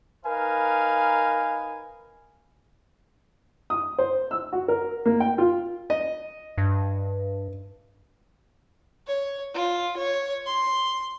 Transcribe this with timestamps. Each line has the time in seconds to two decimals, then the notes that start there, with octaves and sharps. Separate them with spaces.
0.25 D#4 A#4 B4 F5 G#5
3.70 D#6
3.99 C5
4.31 E6
4.53 F#4
4.68 A#4
5.06 A#3
5.20 G5
5.38 F4
5.90 D#5
6.58 G2
9.07 C#5
9.54 F4
9.97 C#5
10.46 C6